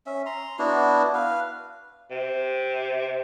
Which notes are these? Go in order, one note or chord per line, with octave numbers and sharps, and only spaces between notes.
C#4 E5
A#5 C6
B3 D4 E4 F#4
B4 F5
C3